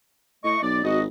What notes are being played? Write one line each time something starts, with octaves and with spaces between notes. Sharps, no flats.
A2 A3 D#5 C#6
B1 D5
G#1 F#4 D#5